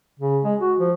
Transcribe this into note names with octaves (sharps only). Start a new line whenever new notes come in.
C#3
G#3
F#4
F3